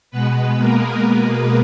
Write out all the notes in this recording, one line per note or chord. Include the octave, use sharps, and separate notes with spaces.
B2 G#3 B3 B4
A#3 A#4